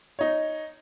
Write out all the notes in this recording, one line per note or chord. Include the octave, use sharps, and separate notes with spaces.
D#4 C#5